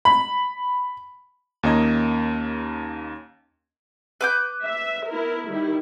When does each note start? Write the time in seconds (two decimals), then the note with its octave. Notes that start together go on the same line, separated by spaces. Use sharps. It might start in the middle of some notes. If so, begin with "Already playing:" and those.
0.05 B5
1.63 D#2 A#3 C#4 D#5 A#5 G#6
4.21 B4 D6 G6
4.66 E5
5.10 B3 E4 A#4
5.48 D#3 G3 E4